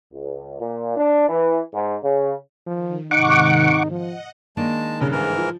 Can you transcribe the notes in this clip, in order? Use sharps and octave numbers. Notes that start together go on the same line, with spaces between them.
C#2
A#2
D4
E3
G#2
C#3
D#3 F3
G#2 C3 D#3 D#4 F#5 C#6 D6
F3 D#5 F#5
D#3 G#3 A#3 D4 A5
G2 C#3 A#4
G#2 E3 A#4
F3